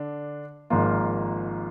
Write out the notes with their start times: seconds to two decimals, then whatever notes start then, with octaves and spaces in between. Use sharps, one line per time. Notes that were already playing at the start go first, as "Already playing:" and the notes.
Already playing: D3 D4
0.70 G#1 G#2 F3 A#3 F4